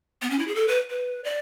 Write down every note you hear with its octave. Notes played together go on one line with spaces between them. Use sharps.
B3
C#4
E4
G#4
A4
B4
B4
D5